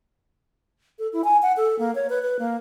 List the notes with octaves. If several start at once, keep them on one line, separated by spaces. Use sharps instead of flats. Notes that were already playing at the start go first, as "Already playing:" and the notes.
A4
E4
G#5
F#5
A4
A#3
C#5
B4
B4
A#3